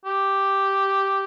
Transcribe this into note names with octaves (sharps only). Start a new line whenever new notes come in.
G4